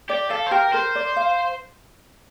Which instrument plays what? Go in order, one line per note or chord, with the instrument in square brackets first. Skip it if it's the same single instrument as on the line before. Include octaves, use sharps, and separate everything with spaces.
[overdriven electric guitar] G4 [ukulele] D5
[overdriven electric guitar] A4 [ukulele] F5
[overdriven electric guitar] C5
[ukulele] G4 [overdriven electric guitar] A#4
[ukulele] A#4 [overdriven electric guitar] C5
[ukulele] D5
F5